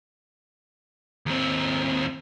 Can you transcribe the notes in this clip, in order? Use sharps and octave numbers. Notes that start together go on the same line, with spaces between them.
D#2 C4